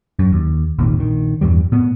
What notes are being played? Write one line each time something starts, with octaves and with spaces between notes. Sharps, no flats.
F#2
D#2
G#1 D#2 A#2 D#3
A#1 D#3
E2 G2 E3 G3
A2 B3